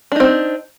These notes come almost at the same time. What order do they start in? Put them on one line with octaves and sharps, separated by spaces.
D4 D#4 C4